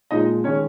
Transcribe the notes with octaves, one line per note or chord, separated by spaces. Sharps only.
A#2 F3 G#3 D#4 D#5
D#3 G#3 C#4 C#5